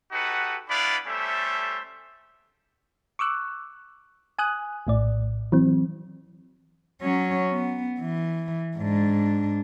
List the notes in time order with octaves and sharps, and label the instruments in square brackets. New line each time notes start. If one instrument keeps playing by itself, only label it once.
[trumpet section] D#4 F#4 G4 A4 B4 F#5
B3 D4 E4 D5 F5 B5
G3 A3 C#4 A4 C5 E5
[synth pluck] C#6 D6 E6 F#6
G#5 D#6 F#6
A#1 A2 D5
E3 F#3 C4
[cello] F#3 C#4
B3
E3
G#2 D4